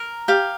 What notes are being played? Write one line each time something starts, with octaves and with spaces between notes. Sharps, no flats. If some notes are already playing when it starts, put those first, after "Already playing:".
Already playing: A#4
G4 F5